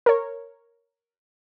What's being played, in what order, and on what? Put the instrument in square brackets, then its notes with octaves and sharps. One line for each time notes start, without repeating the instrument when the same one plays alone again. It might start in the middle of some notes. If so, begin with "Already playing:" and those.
[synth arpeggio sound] A#4 C#5